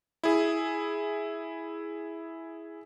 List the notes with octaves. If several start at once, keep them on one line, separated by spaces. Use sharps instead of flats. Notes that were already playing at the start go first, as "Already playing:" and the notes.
E4 G#4